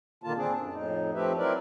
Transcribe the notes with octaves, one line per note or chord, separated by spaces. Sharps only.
A#2 D3 D#3 A#3 F4 A5
C4 D4 G#4
F#2
F2 A2 D#4
F3 A3 C4 G4 B4 E5
F#3 C4 E4 A#4 B4 D5